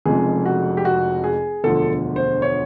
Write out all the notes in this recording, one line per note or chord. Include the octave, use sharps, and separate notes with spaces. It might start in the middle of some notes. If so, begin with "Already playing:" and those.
F1 F2 C#3 F3 G#3 G#4
F#4
G4
F#4
G#4
E1 D2 D3 F3 A4
C5
C#5